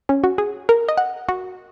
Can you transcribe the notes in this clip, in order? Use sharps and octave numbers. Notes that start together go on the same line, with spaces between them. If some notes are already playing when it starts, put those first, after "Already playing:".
C#4
F#4
G#4
A#4
D#5
F#5
F#4